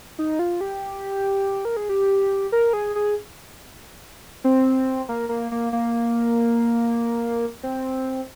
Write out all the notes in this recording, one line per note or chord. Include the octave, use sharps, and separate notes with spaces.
D#4
F4
G4
A#4
G#4
G4
A#4
G#4
G#4
C4
A#3
A#3
A#3
A#3
C4